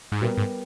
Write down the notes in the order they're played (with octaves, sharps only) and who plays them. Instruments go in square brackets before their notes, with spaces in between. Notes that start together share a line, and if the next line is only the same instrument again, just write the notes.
[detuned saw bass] G#2
[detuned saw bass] A#2 [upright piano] G3 B3 G4 A#4
[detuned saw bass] G#2